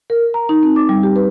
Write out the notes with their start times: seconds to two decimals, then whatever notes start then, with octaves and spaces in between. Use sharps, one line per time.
0.10 A#4
0.34 A#5
0.49 D#4
0.63 C4
0.76 D6
0.89 G3
1.03 G4
1.16 B4